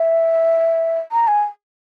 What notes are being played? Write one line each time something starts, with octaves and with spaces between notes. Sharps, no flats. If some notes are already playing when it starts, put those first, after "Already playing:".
Already playing: E5
A#5
G#5